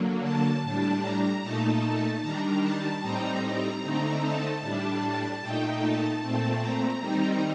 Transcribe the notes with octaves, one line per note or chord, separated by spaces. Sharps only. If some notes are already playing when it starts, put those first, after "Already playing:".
Already playing: D3 F#3 A#3
A5
A2 G3 D4
A#5
A#2 A3 D#4 A5
D#3 G3 D4 A#5
A5
A2 G3 C4 D#4 A#5
A#5
D3 A3 C4 D#4
A5
A2 G3 D4
A#2 A3 D#4 G5
A5
A#2 A3 C4
A#5
D#3 G3 C4 D#4